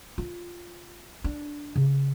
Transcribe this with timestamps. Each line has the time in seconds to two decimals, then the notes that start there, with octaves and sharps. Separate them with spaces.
0.18 F4
1.24 D4
1.76 C#3